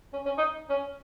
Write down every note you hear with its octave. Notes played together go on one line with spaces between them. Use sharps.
C#4
C#4
D#4
C#4